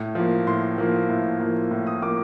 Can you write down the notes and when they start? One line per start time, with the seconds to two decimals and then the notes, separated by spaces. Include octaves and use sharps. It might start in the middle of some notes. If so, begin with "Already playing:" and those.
Already playing: A2
0.15 F3 A#3
0.47 A2 C6
0.78 F3 A#3
1.09 A2
1.40 F3 A#3
1.71 A2
1.87 D#6
2.02 F3 A#3 D6